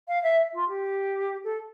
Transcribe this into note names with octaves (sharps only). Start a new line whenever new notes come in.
F5
E5
F4
G4
A4